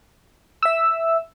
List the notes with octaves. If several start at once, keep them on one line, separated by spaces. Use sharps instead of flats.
E5 E6